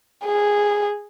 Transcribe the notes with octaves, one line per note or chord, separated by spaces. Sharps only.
G#4